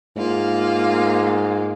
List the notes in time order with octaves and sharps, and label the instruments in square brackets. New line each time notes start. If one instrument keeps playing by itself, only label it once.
[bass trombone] G#2 [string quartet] A#3 F4